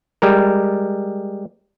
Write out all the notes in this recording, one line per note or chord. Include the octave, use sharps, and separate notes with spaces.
G3 G#3 A#4